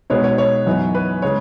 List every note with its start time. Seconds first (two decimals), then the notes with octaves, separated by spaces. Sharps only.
0.10 B2 G#3 B3 D#4 C#5
0.24 C#5
0.38 C#5
0.66 F#2 E3 B3 D#4
0.95 B4
1.22 C#3 G#3 C#5